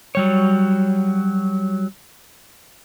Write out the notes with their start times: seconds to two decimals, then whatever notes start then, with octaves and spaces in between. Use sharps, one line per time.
0.15 F#3 G3 C#5